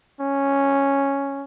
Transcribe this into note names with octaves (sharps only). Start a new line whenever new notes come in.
C#4